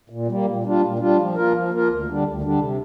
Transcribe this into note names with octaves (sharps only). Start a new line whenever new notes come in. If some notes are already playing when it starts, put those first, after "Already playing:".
A#2
G3 A#3
A#2
G3 D4 F4
A#2
G3 D4 F4
F3
A#3 F4 A#4
F3
A#3 F4 A#4
D2
D3 G3 D4
D2
D3 G3 D4
C3